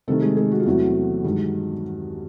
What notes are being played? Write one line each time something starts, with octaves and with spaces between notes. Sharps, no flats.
C3 D#3 G3 A3 A4
G#3 G#4
G#3 G#4
F#4
F4
E2 C3 E3 F#3 A3 F#4
G2 D#3 G#3